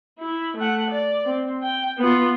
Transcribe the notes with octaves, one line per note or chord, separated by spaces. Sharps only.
E4
A3 F#5
D5
C4
G5
B3 F4